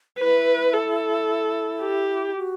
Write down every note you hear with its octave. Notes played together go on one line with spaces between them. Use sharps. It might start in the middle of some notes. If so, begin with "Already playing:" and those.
E4 B4
A4
G4
F#4